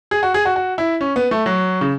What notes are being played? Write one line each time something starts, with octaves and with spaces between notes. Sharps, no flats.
G#4
F#4
G#4
F#4
F#4
E4
C#4
B3
A3
F#3
C#3